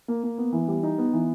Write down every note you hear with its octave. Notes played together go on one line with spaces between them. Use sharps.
A#3
A#3
B3
E3
G3
D#4
B3
E3